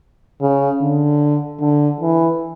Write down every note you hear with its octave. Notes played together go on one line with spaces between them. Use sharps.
C#3
D3
D3
E3